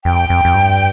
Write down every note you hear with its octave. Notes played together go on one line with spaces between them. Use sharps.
F2 G5
F2
F2
G2